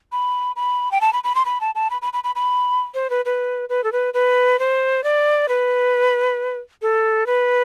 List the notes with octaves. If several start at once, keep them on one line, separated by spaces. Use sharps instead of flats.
B5
B5
G5
A5
B5
B5
C6
B5
A5
A5
B5
B5
B5
B5
B5
C5
B4
B4
B4
A4
B4
B4
C5
D5
B4
A4
B4